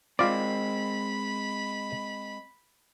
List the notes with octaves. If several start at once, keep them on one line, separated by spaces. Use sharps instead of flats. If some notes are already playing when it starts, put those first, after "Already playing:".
G#3 C4 F4 D5 B5